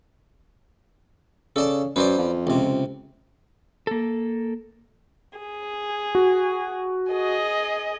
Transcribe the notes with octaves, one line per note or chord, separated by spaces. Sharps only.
C#3 A4 D5 A5
F#2 B4 C5 D5
F2
C#2 C3
A#3 A4
G#4
F#4
G#4 D#5